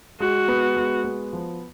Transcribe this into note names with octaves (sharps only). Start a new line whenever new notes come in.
G#3 F#4
B3
G#3
B3
F3